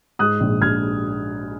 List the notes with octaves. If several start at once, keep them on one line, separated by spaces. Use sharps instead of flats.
G#2 D#6 F#6
A#1
A#1 F6 G#6